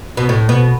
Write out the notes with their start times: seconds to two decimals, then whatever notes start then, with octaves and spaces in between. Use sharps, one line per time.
0.17 B2
0.29 A2
0.49 B2